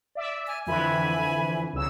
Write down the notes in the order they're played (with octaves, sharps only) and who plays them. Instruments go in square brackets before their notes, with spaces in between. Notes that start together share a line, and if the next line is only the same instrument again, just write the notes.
[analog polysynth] D5 E5
[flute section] G#5 F6
[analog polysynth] F2 D3 E3 [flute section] E5 G#5 B5
[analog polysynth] C2 C#3 E6